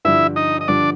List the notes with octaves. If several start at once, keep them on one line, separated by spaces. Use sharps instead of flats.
G2 D3 F3 E4 E5
D#4 D#5
D#5
G2 D3 F3 D4 D5